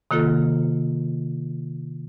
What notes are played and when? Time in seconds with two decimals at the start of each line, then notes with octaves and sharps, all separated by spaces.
0.11 C3 D#3 A#3 F4 A4